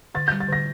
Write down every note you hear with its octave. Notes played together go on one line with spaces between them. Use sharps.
D3 A6
G6
G3
A6
D3 A#6